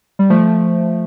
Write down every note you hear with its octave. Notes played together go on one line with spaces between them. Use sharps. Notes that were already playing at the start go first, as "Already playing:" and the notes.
G3
F3 A3